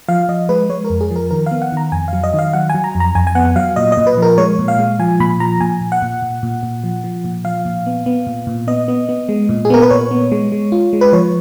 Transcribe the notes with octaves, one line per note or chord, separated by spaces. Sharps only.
F3 F5
F3 D#5
G#3 B4
G#3 C#5
A#4
F2
G#4
F3
A#4
D#3 A#4
F5
B3
F#5
D#3 A#5
F2 G#5
F#3 F5
D#5
D#3
F5
F#3 F#5
F#3 G#5
A#5
F2
A#5
F2 G#5
G#5
B3 F#5
F#3 F5
A#2 D#5
D#5
A#2
B4
F3 A#4
G#3 C#5
A#2
F5
G#3
F3 G#5
A#2 B5
F3 A#5
A#2 G#5
A#2
F#5
A#2
A#2
A#2
A#2
F3
F3
A#2
F3 F5
A#2
B3
B3
A#2
A#2
B3 D#5
B3
B3
G#3
A#2
G#4
B3 A#4
B4
A#2 C#5
B3
G#3
G#3
F4
G#3
B4
F3 C#5